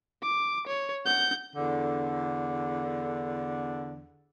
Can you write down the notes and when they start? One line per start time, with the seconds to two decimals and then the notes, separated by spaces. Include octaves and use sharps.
0.22 D6
0.67 C#5
1.06 F#5 G6
1.56 E2 D3